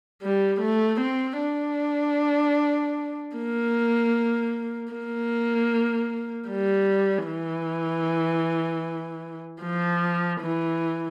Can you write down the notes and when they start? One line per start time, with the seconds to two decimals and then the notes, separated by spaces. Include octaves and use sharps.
0.22 G3
0.61 A3
1.01 C4
1.40 D4
3.36 A#3
4.92 A#3
6.49 G3
7.27 E3
9.62 F3
10.41 E3